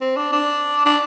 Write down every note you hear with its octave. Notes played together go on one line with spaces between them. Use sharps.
C4
D4
D4
D4